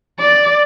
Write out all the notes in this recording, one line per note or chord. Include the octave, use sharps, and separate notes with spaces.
D5